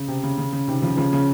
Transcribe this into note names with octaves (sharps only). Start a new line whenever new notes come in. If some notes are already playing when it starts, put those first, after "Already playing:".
Already playing: C#3
C3
C#3
C#3
C#3
C3 D#3
C#3 F3
C#3 F3
C#3